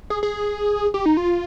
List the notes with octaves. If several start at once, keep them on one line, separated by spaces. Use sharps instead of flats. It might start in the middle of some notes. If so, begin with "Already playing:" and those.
G#4
G#4
G4
D#4
F4